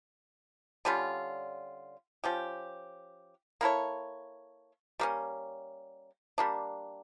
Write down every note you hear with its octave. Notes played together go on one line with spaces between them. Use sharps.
D3 G3 C#4 F4
F3 C#4 G4
A#3 E4 A4 C#5
G3 A#3 C#4
G3 A#3 D4